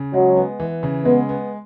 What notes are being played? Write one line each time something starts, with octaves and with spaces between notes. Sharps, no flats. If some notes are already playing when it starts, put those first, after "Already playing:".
Already playing: C#3
F#3 G#3
B3
E3
C#3
G#3 B3
B3